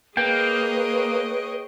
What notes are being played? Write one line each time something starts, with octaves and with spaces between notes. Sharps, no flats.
A#3 G#4 B4 C#5 D#5 G5